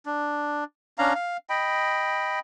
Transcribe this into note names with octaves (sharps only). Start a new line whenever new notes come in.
D4
C#4 D4 F5 A#5
F5
D#5 G5 B5